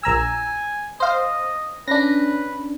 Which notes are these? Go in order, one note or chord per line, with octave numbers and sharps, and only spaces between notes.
A#1 G#5 A#5 E6
C5 D#5 F5
C#4 D4 B4 A#6